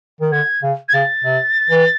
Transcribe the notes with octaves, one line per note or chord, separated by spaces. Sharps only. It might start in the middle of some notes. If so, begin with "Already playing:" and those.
D#3
D3 G#6
C#3
G#6
C#3 A6
C3
E3